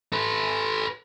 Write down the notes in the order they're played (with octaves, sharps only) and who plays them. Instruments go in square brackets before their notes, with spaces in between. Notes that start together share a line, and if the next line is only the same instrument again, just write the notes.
[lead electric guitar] A4 B4